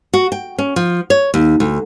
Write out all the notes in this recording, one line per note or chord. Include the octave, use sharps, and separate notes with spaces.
F#4
G5
C#4
F3
C#5
D#2
D2